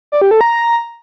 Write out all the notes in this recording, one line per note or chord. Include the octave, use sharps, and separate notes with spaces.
D5
G4
A4
A#5